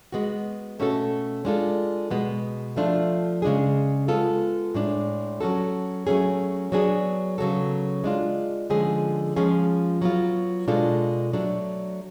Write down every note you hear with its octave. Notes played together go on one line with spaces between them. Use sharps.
G#3 B3 F#4
B2 A3 C#4 F#4 A4
G#3 D4 F4 A4
B2 G#3 B3
F3 A3 D4 F4
C#3 G#3 D4 G#4
G#3 B3 F4 A4
A2 G#3 D4
F#3 C#4 F#4 A4
F#3 A3 C#4 G#4
F#3 B3 D4 G#4
C#3 F#3 B3 F#4 A4
G#3 D4 F4
D3 F3 G#3 C#4 G#4
F3 G#3 C#4 F4 G#4
F#3 B3 F4
B2 G#3 D4 F4 A4
F#3 A3 D4